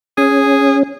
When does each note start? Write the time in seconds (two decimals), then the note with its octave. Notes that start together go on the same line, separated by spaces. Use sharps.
0.18 C#4 G#4